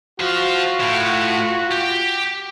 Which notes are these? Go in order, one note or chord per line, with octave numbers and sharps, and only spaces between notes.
F4 F#4 C5 F5
A2
G4